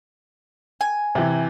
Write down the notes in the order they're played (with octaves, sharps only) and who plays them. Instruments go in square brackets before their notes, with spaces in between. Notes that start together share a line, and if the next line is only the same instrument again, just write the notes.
[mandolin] G#5
[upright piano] C3 E3